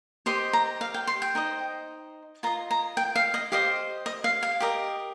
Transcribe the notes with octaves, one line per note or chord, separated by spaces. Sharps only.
G4 C5 D#5 C6
A#5
F5
G5
C6
G5
D#4 C5 D#5
F4 D#5 A#5
A#5
G5
F5
D#5
G4 C5 D#5 F5
D#5
F5
F5
G4 A#4 D#5